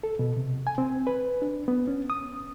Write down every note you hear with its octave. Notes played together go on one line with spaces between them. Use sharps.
A4
B2
C3
G#5
C4
B4
D4
B3
C#4
D#6